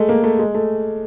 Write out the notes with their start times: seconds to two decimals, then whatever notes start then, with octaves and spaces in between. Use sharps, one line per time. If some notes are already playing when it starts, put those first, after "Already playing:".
Already playing: G#3 A3
0.09 A#3
0.24 A3
0.39 G#3
0.55 A3